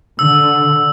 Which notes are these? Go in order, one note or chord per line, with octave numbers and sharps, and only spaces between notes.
D3 E6